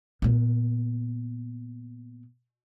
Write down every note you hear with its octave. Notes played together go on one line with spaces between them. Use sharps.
A#2 B3